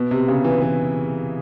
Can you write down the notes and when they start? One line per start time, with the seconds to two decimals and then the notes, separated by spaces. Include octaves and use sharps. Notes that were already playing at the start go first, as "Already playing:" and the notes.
Already playing: B2
0.11 C3
0.28 C#3
0.44 E3
0.61 E3